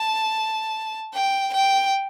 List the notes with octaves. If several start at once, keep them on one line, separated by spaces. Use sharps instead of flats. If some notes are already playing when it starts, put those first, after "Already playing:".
Already playing: A5
G5
G5